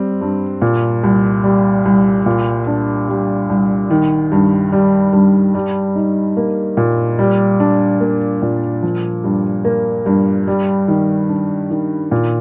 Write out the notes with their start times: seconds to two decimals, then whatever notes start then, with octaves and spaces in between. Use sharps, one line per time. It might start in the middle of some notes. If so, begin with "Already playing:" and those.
Already playing: G3 C4
0.21 G2
0.62 A#2
1.03 C2
1.44 G3
1.85 C2
2.26 A#2
2.67 D4
3.09 G3
3.49 C2
3.90 D#3
4.32 G2
4.72 G3
5.13 G2
5.55 G3
5.96 D#4
6.37 A#3
6.77 A#2
7.19 G3
7.60 D4
8.00 A#3
8.42 A#2
8.82 F3
9.24 G2
9.65 A#3
10.06 G2
10.47 G3
10.88 D#3
11.29 D4
11.70 D#3
12.11 A#2